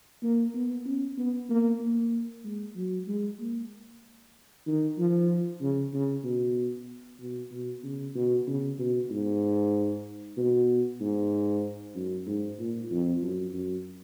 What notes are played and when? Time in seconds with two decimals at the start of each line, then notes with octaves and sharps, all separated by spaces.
0.23 A#3
0.55 B3
0.86 C#4
1.18 B3
1.50 A#3
1.81 A#3
2.44 G#3
2.76 F#3
3.08 G#3
3.40 A#3
4.67 D#3
4.98 F3
5.61 C#3
5.94 C#3
6.24 B2
7.20 B2
7.52 B2
7.83 C#3
8.15 B2
8.47 C#3
8.78 B2
9.10 G#2
10.37 B2
11.00 G#2
11.96 F#2
12.27 G#2
12.59 A#2
12.91 F2
13.22 F#2
13.53 F#2